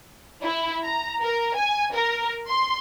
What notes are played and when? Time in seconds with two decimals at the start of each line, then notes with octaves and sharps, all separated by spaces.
0.42 E4
0.84 A#5
1.21 A#4
1.56 G#5
1.93 A#4
2.48 C6